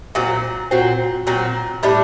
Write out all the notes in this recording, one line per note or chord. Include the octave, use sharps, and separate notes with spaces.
A#2 F#3 C4
A#2 F#3 C4
A#2 F#3 C4
A2 G3 D4